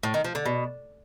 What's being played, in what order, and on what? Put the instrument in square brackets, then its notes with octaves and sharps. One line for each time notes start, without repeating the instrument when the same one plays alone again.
[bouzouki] A2
D#3
F3
D3
B2